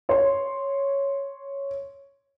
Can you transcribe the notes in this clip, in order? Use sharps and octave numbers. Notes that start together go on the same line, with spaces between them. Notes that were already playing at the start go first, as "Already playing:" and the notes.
C#5 C6